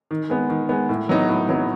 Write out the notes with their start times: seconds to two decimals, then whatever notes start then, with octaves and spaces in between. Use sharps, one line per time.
0.11 D#3
0.30 G#3 B3
0.50 D#3
0.69 G#3 B3
0.89 A2
1.09 F#3 B3 D#4
1.29 A2
1.49 F#3 B3 D#4